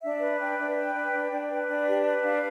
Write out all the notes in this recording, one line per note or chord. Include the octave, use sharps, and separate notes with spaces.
D4 E5
B4
D4 G5
D4
B4
D4
D4
D4
B4
D4
G4
B4
D4 F5